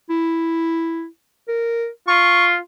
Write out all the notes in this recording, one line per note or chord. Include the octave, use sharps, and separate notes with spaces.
E4
A#4
F4 C#6